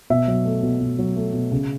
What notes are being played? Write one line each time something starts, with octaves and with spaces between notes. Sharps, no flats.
B2 E5
F#3
A3
B2
B2
F#3
A3
B2
C#3